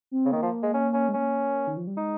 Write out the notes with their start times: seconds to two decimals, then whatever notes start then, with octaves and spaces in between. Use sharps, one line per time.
0.11 C4
0.25 C#3
0.32 D#3 A#3
0.42 F3
0.63 G#3
0.74 C#4
0.94 C#4
1.08 G#3
1.14 A#3 C#4
1.67 D#3
1.77 F3
1.87 G3
1.97 G#3 D#4